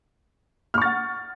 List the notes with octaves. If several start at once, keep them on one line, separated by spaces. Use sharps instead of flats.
F#5 C#6 F6 A6